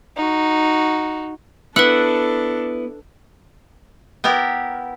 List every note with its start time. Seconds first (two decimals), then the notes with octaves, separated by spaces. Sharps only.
0.17 D#4 F#4
1.76 B3 D4 E4 A4 B4 F#5 E6
4.24 B3 E4 G4 A#4